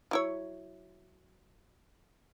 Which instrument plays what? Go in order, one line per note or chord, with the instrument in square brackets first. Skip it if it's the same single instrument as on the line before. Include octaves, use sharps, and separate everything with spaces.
[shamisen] F#3 E4 C#5